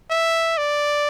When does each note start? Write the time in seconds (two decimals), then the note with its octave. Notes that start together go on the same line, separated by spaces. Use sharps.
0.10 E5
0.57 D5